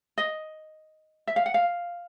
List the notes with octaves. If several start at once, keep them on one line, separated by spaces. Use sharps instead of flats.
D#5
E5
F5
F#5
F5